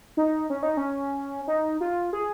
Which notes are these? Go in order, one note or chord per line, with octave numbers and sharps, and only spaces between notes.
D#4
C#4
D#4
C#4
D#4
F4
G#4